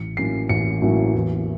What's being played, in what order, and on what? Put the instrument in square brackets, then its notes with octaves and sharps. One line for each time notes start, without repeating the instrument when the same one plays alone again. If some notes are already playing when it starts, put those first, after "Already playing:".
Already playing: [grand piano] A1 C#7
A2 F#3 A#3 C#4 C7
A1 C#7
A2 F#3 A#3 C#4
E2